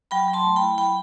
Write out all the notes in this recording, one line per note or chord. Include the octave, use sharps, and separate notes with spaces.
F#3 G5 B5
F#3
A5 C6
A3
G5 B5
E4
F#3 G5 B5